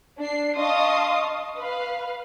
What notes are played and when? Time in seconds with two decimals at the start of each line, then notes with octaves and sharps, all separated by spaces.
0.19 D4 C7
0.58 D#5 F5 A5 C6 C#6 D#6
1.58 B4 F5